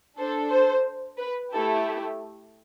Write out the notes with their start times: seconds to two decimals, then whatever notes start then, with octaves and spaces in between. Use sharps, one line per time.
0.17 D4 A4 C5
0.50 C5
1.19 B4
1.52 A3 E4 G4 A4